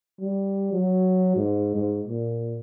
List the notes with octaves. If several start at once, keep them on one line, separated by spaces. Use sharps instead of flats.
G3
F#3
G#2
G#2
A#2